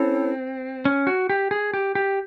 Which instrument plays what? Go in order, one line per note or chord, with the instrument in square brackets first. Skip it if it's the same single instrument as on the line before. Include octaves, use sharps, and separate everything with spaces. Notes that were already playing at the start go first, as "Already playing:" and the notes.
Already playing: [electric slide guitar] C4 [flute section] C#4 E4 A4 C#5
[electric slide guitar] C#4
F#4
G4
G#4
G4
G4